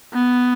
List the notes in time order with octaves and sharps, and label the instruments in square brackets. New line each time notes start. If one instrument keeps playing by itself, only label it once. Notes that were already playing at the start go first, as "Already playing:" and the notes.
[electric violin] B3